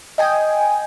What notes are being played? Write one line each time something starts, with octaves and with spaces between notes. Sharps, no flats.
D#5 G5 G#5